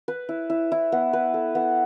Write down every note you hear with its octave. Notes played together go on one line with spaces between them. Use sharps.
B4
E4
E4
E4
B3
B4
A4
B3